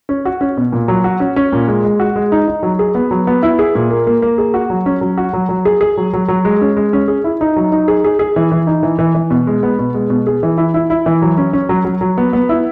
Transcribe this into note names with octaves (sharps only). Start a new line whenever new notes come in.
C#4
F#4
C#4
B2
A#2
F#3
F#4
C#4
C#4
A#2
G#3
G#3
F#4
G#3
D#4
D#4
F#3
G#4
B3
F#3
B3
E4
G#4
A#2
A#3
A#3
A#3
G#4
F#4
F#3
C#4
F#3
F#4
F#3
F#3
G#4
G#4
F#3
F#3
F#3
G#3
C#4
G#3
C#4
G#4
E4
D#4
F#3
D#4
G#4
G#4
G#4
E3
E3
D#4
E3
E3
E3
B2
G#3
B3
B2
G#3
B2
G#4
E3
E4
E4
E4
E3
F#3
C#4
C#4
F#3
F#3
F#3
B3
B3
E4